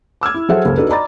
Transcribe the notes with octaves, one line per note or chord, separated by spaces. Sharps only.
D6 E6 F6 G#6
E4
F#3 G#4 A4 C5 E5 F#5
F#1 C#2 A#3 A4 C5
D4 D#4 F#4 A4 B4
D5 D#5 A#5 B5 D6 A6